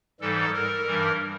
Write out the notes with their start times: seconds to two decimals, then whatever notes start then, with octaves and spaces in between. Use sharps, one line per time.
0.21 G#2 E3 G3 A4
0.53 A#4
0.86 G2 E3 G3